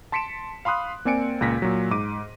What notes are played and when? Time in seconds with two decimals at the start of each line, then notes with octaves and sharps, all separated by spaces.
0.12 A5 C6 B6 C#7 D7 E7
0.65 F5 B5 C6 D#6 F#6
1.05 A#3 C4 D5 G#5 C#7 D7
1.41 C#2 A#2 A#6 B6
1.62 A#2 F#3
1.91 G#2 D6 D#7